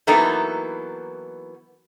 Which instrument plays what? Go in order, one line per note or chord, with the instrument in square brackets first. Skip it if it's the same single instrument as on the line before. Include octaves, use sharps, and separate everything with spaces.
[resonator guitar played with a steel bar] E3 F#3 A#3 B3 D#4 A4